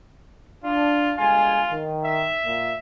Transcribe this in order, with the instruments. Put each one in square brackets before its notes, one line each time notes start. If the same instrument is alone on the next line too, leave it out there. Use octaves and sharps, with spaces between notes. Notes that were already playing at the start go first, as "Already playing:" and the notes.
[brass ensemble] D4 [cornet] F4
[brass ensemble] G1 G#3 G#5 [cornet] F4
[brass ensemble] D#3
[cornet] E5
[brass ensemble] A#2